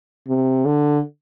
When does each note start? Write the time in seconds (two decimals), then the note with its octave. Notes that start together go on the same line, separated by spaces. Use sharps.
0.28 C3
0.66 D3